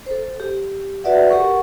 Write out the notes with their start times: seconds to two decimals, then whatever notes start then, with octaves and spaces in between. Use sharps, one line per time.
0.06 A4 C5
0.40 G4
1.04 F#4 B4 D5 E5 F#5
1.30 G4 A4 A#4 F#5 C#6